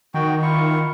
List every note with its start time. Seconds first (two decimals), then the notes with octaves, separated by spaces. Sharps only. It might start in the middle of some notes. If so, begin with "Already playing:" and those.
0.14 D#3 F#4 G5
0.42 E4 F4 C#6